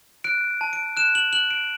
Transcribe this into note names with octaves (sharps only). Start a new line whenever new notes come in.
F#6 D7
A5
D7
F#6 E7
F#7
F#6 F#7
D7